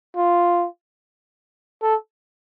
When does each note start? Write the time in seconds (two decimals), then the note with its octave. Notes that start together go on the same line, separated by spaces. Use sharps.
0.16 F4
1.82 A4